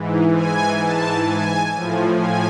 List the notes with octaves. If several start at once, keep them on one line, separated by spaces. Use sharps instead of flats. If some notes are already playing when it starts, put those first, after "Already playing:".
Already playing: G#2 E3
G#5
A5
G#5
A2 F3
G#5